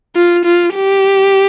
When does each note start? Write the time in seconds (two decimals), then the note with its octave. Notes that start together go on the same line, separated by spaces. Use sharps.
0.16 F4
0.45 F4
0.75 G4